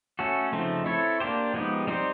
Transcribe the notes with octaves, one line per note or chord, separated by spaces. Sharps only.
A3 C#4 F#4 A4
C#3 F3 A3 C4 D#4
C4 E4 A4 C#5
A#3 D4 G4 C5
F3 G#3 B3 D#4 G4
G3 C4 D#4 G4 C5